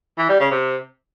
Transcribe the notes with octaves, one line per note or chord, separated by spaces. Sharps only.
E3
G3
C#3
C3